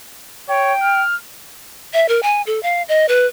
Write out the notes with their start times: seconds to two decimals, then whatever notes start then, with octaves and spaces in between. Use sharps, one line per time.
0.49 C#5 G5
0.82 F6
1.94 E5
2.09 A#4
2.23 G#5
2.47 A4
2.63 F5
2.89 D#5
3.09 B4